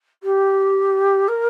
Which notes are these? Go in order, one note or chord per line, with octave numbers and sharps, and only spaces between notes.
G4
A#4